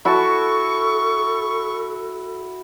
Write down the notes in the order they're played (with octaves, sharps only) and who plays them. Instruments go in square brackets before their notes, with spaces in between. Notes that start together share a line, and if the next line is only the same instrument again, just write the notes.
[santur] E4 F#4 A5 [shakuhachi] A4 [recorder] C#6